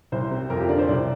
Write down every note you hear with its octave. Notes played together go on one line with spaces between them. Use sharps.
C2 C5
C3
F2 A#4
F4
G4
D3 D5
C5
C2 D5